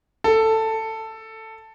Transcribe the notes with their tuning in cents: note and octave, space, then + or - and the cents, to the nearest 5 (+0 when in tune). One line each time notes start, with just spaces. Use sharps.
A4 +10